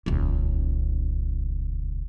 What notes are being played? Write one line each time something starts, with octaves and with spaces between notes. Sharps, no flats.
D#1 C#2